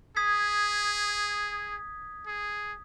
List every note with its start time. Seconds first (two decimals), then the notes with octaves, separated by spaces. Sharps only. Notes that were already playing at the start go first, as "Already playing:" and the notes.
0.16 G#4 D#6 G#6 B6
2.27 G#4